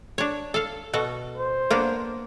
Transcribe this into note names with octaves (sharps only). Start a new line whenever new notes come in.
D4 C#5
A4 F5
B2 F#4 A4
C5
A#3 B3 D4